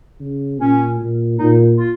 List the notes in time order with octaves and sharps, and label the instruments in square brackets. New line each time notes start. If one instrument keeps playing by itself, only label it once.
[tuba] C#3
[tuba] A#2 [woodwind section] C#4
[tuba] A#2
[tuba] A#2 [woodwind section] D#4
[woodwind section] F4